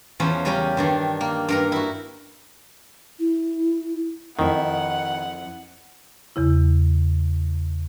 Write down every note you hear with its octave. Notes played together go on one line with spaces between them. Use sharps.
E2 F3 C#4 C5
C#3 G3 C#4 G4 A#4
G2 D#3 D4
A#3
G2 A#4 A#5
E4 F#4
E4
F2 D#3 E4 F#5
E2 C#3 E4